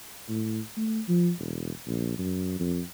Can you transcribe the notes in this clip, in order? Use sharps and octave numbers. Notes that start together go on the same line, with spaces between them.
A2
A3
F3
E1
A#1
F#2
F2